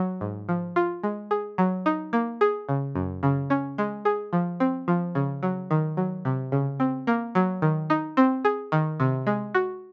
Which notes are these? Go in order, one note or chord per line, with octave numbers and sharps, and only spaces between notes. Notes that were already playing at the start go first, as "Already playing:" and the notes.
Already playing: F#3
G#2
F3
F4
G#3
G#4
F#3
D#4
A#3
G#4
C#3
F#2
C#3
C#4
G#3
G#4
F3
C4
F3
C#3
F#3
D#3
F#3
C3
C#3
C4
A#3
F#3
D#3
D#4
C4
G#4
D#3
C3
G#3
F#4